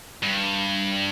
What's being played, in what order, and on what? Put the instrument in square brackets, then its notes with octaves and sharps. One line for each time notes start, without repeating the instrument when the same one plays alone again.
[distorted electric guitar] G2